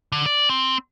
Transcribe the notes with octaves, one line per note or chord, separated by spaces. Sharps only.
D3
D5
C4